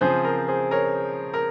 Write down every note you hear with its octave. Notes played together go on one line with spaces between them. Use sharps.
C#3 F3 C4 G#4 C5
A#4
G#4 C5
A#4 C#5
A#4